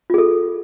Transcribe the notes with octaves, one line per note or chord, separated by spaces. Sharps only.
F4 G#4 A4